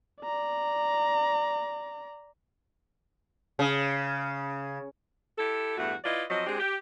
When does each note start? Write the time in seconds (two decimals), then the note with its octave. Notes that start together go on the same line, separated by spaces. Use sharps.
0.22 D5 A#5
3.59 C#3
5.38 E4 G4 A4
5.78 E2 G2 A3 F#4
6.05 E4 F4 B4 D5 D#5
6.29 F3 F#3 C4 D#5
6.47 G#3 C4 D4 G4 G#4
6.58 G4